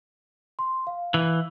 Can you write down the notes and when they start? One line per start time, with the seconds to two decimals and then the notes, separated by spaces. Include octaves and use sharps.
0.59 C6
0.87 F5
1.14 E3